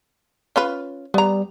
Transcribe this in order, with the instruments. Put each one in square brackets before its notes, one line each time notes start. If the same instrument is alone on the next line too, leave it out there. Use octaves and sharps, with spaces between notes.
[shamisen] C#4 F4 B4
[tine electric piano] G3 [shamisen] B3 A#5